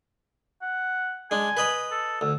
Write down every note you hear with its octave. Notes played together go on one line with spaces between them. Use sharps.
F#5
G#3 D4 G#5
B4 D#5 B5
A4
D2 E6